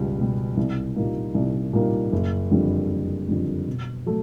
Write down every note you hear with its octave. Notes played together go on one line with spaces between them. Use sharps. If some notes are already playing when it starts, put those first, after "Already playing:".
Already playing: C#2 B2 G3
B2 G3
C2
A#2 G3 A#3 D#4
C2
A#2 G3 A#3 D#4
F#1
F2 D3 G3
F#1
F2 D3 G3
B2
F#3 A3